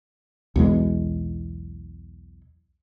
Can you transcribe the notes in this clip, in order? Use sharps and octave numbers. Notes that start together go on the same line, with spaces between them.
B1 E2 G#3